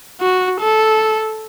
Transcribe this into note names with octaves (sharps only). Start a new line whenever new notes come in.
F#4
A4